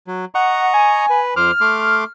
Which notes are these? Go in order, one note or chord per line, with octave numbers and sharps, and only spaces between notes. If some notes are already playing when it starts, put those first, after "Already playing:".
F#3
D#5 F#5 A#5 C#6
G#5
B4
F2 C5 D6 F6
A3 C6 D6